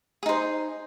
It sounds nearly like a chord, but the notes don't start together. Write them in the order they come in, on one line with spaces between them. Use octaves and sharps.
G#4 D#4 C5